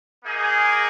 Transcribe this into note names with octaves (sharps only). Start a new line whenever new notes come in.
A#3 D#4 G#4